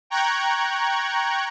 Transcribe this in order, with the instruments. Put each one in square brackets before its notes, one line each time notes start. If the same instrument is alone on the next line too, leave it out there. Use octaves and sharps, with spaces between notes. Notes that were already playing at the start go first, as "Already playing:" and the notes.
[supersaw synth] G5 A#5 C#6 F#6 G#6